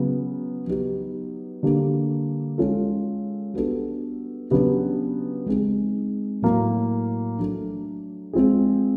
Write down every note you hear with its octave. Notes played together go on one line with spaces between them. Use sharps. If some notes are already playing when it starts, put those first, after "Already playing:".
Already playing: C#3 F#3 B3
F#3 B3 D#4 G4
D3 G3 A#3
G#3 C#4 F4 A4
G3 B3 D4 F#4 A4
C#3 F#3 B3 D4 G4
G#3 C4 D#4 G#4
A2 F#3 A#3
F#3 A3 D4
G#3 C4 F4 G#4